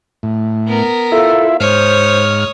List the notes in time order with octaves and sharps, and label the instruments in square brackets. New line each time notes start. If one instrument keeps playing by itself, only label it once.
[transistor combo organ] A2
[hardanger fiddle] B3 A#4
[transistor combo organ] E4 F4 E5 [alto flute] A4
[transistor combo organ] G#2 F6 [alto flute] C5 [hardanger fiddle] C#5 D#6